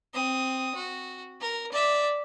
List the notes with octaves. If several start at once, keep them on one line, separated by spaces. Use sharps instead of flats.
C4 D#6
F#4
A#4
D5 E5